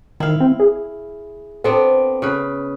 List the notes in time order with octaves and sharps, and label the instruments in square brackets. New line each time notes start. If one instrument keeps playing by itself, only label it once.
[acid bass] D#3 [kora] E4 F5
[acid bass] C4
G#4
[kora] B3 C4 D4 [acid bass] A4
[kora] C#3 B4